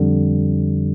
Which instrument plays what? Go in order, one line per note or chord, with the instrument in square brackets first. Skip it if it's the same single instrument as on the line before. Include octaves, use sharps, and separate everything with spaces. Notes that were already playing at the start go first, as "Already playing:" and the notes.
Already playing: [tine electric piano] F2 D3 G3